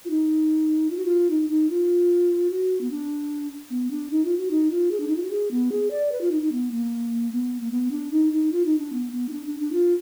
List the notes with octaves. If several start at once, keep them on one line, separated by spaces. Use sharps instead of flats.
F4
D#4
F4
F#4
F4
D#4
D#4
F4
F#4
B3
D4
B3
D4
D#4
F4
F#4
D#4
F4
G#4
D4
D#4
F4
F#4
G#4
B3
G#4
D5
B4
F4
D#4
D#4
B3
A#3
B3
A#3
B3
D4
D#4
D#4
F4
D#4
D4
B3
B3
D#4
D4
D4
D4
F4